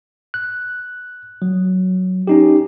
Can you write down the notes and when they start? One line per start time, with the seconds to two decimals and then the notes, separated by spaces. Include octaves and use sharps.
0.34 F#6
1.42 F#3
2.27 C#4 D#4 G4